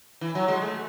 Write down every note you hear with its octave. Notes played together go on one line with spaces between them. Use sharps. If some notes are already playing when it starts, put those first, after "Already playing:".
E3
F#3
G#3
A3